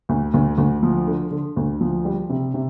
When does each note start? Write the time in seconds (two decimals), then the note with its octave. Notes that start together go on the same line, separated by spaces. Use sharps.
0.09 D2
0.34 D2
0.58 D2
0.83 F3
1.07 D3
1.31 D3
1.57 D2
1.81 F3
2.05 G3
2.30 C3
2.54 C3